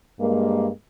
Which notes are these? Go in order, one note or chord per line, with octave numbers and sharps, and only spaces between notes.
G2 G#3 A#3